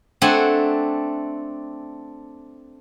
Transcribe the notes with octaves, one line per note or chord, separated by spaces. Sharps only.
A3 C4 D4 F#5 G#5